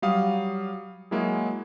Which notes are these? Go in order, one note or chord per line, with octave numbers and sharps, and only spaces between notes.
F#3 G3 F5 D#6
F#3 G#3 A#3 E4 G#4